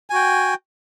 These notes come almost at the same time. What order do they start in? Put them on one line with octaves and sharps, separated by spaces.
G#5 F#4 G5